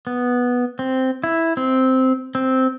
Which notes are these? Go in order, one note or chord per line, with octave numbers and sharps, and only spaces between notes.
B3
C4
E4
C4
C4